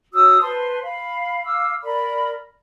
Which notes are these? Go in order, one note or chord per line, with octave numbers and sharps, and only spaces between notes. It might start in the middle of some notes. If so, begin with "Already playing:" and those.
F#4 C#5 D#6 E6
B4 C5 A5 C6
F5 B5
F5 D6 E6 F6
A#4 D5 B5